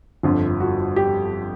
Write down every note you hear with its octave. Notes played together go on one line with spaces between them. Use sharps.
G1 F2 D3 F4
F#4
G4